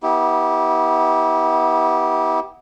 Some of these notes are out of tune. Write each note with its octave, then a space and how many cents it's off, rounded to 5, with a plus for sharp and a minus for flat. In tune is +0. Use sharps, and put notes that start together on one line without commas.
B3 -20 E4 -40 G4 +0